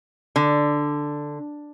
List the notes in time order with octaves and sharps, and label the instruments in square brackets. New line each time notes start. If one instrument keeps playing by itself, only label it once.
[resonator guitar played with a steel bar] D3